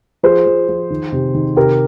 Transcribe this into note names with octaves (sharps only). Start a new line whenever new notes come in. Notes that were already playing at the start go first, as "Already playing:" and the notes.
F3 G#4 C5
F3
F3
D#3
C3
D#3
C3 G4 A#4